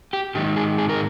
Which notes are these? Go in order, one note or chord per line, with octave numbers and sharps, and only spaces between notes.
G4
G#2 D#3 G4
G#4
G#4
A#4